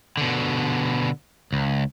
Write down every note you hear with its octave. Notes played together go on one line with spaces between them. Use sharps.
B2 D3
C#2